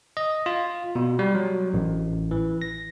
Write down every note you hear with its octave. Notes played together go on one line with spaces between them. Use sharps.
D#5
F4
B2
G3
F#3
A1
E3
A#6